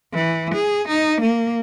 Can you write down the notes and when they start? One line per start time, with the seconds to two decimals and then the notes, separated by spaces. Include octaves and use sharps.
0.14 E3
0.54 G#4
0.88 D#4
1.21 A#3